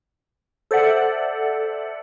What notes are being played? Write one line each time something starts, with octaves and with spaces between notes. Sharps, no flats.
A4 C5 D5 E5 F#5